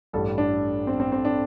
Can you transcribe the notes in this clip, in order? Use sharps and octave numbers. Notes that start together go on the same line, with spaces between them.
A1 G2 G3 A4
D4
C4
C4
C4
D4